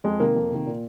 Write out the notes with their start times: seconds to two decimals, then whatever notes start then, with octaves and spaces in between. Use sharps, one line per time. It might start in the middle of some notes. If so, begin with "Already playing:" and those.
0.04 F2 G#3
0.19 C3 D#3 A#3
0.35 F2
0.51 C3 D#3
0.67 A#2